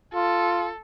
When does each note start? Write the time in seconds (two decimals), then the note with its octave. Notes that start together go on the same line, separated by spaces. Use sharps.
0.14 F4 A4